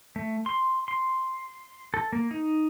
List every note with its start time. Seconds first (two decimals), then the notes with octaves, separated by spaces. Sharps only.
0.16 A3
0.46 C6
0.88 C6
1.94 A4
2.13 A#3
2.31 D#4